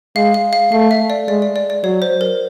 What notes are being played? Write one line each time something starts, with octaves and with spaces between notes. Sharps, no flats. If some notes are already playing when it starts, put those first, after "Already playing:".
G#3 F5
F5
F5
A3 F5
E5
D5
G#3 D5
D5
D5
D5
F#3 C#5
C5
A#4